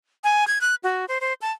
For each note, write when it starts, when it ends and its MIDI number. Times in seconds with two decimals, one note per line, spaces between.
0.24 0.47 80
0.47 0.59 92
0.61 0.75 90
0.84 1.05 66
1.08 1.18 72
1.21 1.34 72
1.42 1.52 81